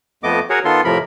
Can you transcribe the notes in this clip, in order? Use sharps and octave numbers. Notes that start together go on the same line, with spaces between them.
F2 A3 B3 D#5 D6
F#4 G#4 A#4 C#5 F#5
D#3 B3 F4 A4 C6
F2 A2 C3 F3 A#4 B5